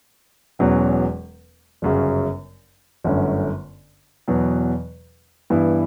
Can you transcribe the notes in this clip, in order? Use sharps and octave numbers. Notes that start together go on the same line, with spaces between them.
E1 E2 B2 F#3 C#4
G1 F#2 C#3 F#3
G1 F#2 D3 A3 C#4
E2 B2 F#3 B3
G2 E3 B3 E4